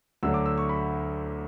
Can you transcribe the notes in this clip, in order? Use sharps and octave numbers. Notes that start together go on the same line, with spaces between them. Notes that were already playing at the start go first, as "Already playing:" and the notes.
D2 D3 F#3 E6
D6
E6
C#6
B5